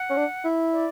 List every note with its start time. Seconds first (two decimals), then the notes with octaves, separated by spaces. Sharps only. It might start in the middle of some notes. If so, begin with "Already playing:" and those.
Already playing: F#5
0.10 C#4
0.17 D4
0.44 E4
0.72 D5